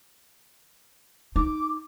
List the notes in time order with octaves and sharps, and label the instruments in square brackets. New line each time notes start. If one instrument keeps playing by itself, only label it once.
[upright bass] D#4 [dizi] D6